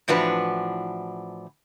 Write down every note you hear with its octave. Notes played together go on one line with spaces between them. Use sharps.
A2 E3 F3 D4 F#4 B4